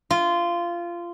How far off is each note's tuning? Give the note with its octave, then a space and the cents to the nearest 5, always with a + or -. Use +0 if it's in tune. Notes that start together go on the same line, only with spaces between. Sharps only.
F4 -15